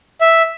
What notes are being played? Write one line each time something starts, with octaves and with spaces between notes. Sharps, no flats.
E5